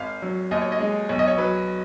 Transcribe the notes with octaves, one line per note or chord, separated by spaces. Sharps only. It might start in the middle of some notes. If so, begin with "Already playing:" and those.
Already playing: G#1 F5
F#3
D#2 D#5
C#5
D#5
G#3
B1 C#5
D#5
C#5
F#3 B4